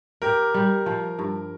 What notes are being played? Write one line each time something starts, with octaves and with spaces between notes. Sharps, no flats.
G4 A#4
G3
F3
G2